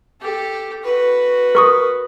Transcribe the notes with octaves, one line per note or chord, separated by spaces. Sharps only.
G4 A4
F#4 B4
A#4 C#6 D#6